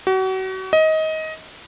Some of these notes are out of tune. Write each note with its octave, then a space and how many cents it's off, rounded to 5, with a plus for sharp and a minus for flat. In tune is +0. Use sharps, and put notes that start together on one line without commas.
F#4 +35
D#5 +20